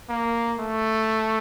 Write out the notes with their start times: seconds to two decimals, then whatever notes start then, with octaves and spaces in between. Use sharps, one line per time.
0.09 A#3
0.59 A3